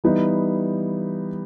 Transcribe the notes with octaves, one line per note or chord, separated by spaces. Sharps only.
E3 G3 B3 D#4